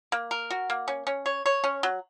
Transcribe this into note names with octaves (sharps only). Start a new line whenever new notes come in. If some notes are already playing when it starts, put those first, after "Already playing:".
A#3
A#4
F#4
A#3
C#4
C#4
C#5
C#5
C#4
F#3